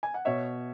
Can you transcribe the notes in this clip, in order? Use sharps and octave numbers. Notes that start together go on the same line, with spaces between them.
G#5
F#5
B2 C#5 E5